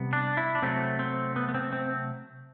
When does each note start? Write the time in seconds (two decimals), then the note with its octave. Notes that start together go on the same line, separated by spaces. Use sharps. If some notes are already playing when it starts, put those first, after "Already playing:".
Already playing: C3 G3 B3
0.13 D4
0.37 E4
0.55 D4
0.62 C3 F#3 A3 C4
0.99 C4
1.36 B3
1.49 B3
1.54 C4
1.73 C4